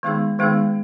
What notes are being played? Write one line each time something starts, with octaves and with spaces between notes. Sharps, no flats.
D#3 G#3 B3 D#4 G#4
D#3 G#3 B3 D#4 G#4